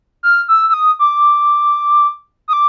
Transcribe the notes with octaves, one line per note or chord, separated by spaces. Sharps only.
F6
E6
E6
D#6
D6
D#6
D6